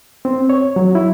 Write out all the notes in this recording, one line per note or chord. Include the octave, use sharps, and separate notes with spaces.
C4
C#5
F#3
E4